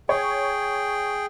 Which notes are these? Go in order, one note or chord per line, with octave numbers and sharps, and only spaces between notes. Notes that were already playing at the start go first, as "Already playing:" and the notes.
G#4 C#5 G5